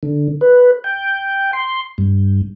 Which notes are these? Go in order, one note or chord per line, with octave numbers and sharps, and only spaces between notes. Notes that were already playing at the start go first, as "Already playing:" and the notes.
D3
B4
G5
C6
G2